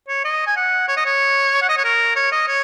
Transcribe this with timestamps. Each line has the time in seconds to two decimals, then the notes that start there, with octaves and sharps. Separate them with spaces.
0.08 C#5
0.25 D#5
0.47 G#5
0.57 F#5
0.88 C#5
0.97 D#5
1.05 C#5
1.62 F#5
1.69 D#5
1.77 C#5
1.84 A#4
2.16 C#5
2.32 D#5
2.48 C#5